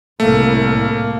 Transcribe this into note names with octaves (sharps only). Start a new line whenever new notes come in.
C2 A2 A3 A#3